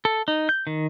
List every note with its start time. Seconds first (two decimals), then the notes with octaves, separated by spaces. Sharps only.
0.05 A4
0.28 D#4
0.49 G6
0.67 D#3